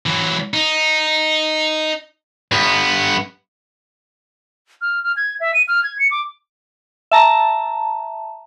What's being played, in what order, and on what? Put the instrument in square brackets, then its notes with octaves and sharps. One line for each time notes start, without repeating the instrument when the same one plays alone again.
[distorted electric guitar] E3 F#3
D#4
[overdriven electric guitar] G2 B3
[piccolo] F6
F6
G#6
E5
D#7
F6
G#6
C#7
D6
[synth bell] E5 A5 A#5